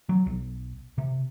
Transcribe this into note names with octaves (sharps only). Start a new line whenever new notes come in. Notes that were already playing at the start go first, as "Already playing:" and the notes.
F#3
B1
C3